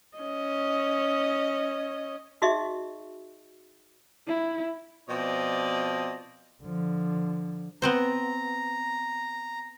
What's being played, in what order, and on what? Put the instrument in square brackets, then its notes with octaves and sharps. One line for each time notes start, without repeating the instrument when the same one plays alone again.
[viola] C#4 D#5
[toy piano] D#4 F#4 G#4 D#5 E5 C#6
[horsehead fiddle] E4
[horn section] B2 F3 C4 C5 D5 D#5
[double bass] D3 F3
[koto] B3 C4 C5 [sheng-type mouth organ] A#5